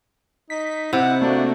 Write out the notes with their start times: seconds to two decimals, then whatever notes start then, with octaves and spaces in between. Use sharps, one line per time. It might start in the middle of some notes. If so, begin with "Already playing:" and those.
0.50 D#4 B6
0.93 C3 E4 F#5
1.22 A3 A#3 D4 F#4